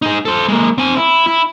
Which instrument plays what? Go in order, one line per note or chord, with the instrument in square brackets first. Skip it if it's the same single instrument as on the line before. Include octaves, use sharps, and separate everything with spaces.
[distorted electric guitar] D#4 G#4
A4 C5
G#3 A#3
C4 G#5
E4
E4